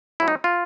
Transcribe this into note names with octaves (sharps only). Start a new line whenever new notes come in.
A2 F#3 E4
D#4
F4